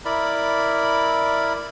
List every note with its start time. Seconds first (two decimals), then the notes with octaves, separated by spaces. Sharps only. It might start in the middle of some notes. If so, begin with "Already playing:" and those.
0.05 E4 A#4 D5 B5